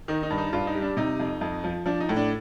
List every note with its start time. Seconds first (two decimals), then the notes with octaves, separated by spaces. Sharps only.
0.08 D#3 D#4
0.23 D#4
0.30 G2
0.38 D#4
0.53 G2 F4
0.67 D#4
0.74 G3
0.82 D4
0.97 C3 D#4
1.20 F2
1.41 F2
1.64 F3
1.86 F3 D4
2.00 D#4
2.09 A2
2.16 D4